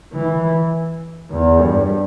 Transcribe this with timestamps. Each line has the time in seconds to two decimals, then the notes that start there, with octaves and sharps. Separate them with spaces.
0.13 E3
1.31 E2
1.61 G2